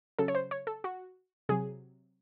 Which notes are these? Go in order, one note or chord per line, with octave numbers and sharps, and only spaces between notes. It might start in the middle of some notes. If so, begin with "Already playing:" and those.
C#3 F#3 A4
C#5
C5
C#5
A4
F#4
C3 F#3 G#4